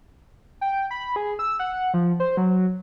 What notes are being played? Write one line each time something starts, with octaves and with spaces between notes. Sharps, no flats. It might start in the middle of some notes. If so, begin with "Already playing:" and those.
G5
B5
G#4
E6
F#5
F3
C5
F#3